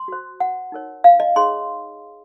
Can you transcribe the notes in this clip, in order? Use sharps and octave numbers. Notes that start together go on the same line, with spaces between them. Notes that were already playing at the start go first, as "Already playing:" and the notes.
Already playing: C6
F#4 C5
F#5
D#4 A#4 C#5
F5
D#5
D#4 G#4 C#5 C6